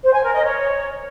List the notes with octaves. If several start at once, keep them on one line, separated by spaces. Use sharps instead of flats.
C5
G#5
A#4
D#5
C#5